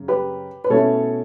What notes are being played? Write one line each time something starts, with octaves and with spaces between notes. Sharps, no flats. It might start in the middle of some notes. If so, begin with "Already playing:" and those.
Already playing: F#2 C#3
G4 B4
B4
B2 A3 C#4 E4 A4 C#5